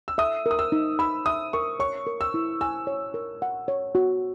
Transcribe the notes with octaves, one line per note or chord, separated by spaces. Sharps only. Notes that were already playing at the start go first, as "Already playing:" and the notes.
E6
E5 D#6
A#4
D#6
E6
D#4
B5 E6
E5 D#6
A#4 C#6
C#5 C#6
A#4
E6
E4
G#5 E6
C#5
A#4
F#5
C#5
F#4